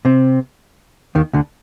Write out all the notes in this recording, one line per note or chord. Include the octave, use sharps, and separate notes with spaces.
C3 C4
D#2 D#3
D2 D3